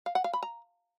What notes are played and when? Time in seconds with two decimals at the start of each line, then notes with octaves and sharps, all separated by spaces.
0.06 F5
0.15 F#5
0.24 F5
0.33 B5
0.43 A#5